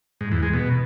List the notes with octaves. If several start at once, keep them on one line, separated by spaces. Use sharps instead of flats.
G#2
E2
G#3
B2